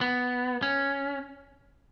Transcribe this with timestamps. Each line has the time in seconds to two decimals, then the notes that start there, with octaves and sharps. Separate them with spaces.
0.01 B3
0.63 C#4